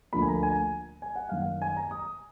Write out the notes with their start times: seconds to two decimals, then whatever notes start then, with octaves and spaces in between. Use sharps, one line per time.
0.13 D2 D3 F3 A#3 B5
0.22 G#5
0.28 A#5
0.43 G#5
1.02 G#5
1.16 F#5
1.29 F#2 D#3 A#3 F5
1.42 F#5
1.62 G#5
1.76 A#5
1.91 D#6